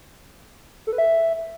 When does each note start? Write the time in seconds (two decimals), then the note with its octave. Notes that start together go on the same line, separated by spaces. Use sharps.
0.87 A4
0.93 B4
0.98 E5